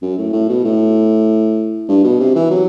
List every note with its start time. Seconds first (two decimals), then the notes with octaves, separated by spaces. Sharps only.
0.02 F#2
0.18 A2
0.33 A2
0.49 B2
0.64 A2
1.88 G2
2.03 B2
2.20 C3
2.35 E3
2.51 F#3